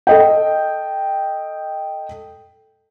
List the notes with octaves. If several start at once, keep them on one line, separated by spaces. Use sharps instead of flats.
A4 D#5 G5